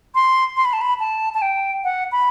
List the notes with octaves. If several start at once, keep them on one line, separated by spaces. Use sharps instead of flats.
C6
C6
B5
A5
B5
A5
A5
G5
F#5
B5